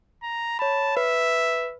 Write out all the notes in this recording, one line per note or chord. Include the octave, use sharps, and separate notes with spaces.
A#5
C#5 A5 B5
B4 E5